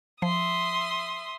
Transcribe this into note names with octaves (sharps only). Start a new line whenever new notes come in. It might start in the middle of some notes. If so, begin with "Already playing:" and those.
F3 E5 C6 D#6